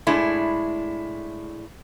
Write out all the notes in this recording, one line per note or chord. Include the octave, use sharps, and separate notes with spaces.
A2 G#3 D4 E4